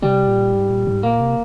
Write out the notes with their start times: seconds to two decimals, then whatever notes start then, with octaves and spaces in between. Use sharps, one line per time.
0.02 C3 G3
0.27 A#2
0.53 G#2
0.70 A#2
0.87 G#2
1.03 A#2 A#3
1.20 C3